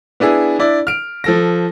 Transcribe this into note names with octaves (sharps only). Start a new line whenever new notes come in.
B3 D4 E4 G#4
D4 E4 D5
F6 D7
F3 A4 A#6